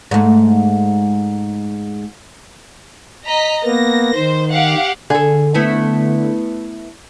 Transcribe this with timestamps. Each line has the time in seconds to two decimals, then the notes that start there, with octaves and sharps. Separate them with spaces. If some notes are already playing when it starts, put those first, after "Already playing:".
0.11 G#2 A3
3.26 D#5 A#5 B6
3.64 A#3 B3 A#6
4.15 D#3 C5
4.50 G4 F5 F#5
5.10 D3 G#4 A4
5.55 A3 B3 E4